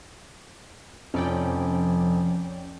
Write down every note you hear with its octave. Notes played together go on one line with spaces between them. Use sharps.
F1 F3 C#4 D5 G5